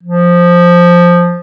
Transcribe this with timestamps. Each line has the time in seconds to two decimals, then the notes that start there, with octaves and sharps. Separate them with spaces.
0.03 F3